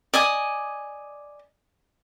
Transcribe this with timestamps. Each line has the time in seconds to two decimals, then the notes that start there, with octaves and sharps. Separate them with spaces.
0.14 D5 D#5 G#5 D#6